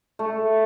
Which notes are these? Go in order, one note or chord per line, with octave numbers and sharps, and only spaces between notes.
A3